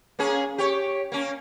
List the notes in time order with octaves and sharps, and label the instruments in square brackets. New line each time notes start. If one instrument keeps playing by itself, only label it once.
[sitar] A#3 C#4 G#4
G4 C#5
A#3 C#4